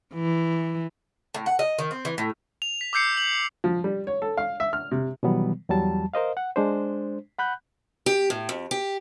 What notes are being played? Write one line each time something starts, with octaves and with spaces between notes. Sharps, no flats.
E3
A2
F#5
D#5
D#3
C4
E3
A2
F7
B6
D6 E6 G6 C7 C#7
F#7
F3
G3
C#5
A4
F5
E5
F6
C3
B2 D#3 E3 F#3 G3 B3
E2 F#3 G3 A5
A#4 C5 D#5 F5
F#5
G#3 D4 C5
F#5 B5 F#6 G6
G4
A2
F2
G4